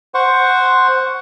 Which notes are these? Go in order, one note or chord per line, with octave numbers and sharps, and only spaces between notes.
C5 F#5 C#6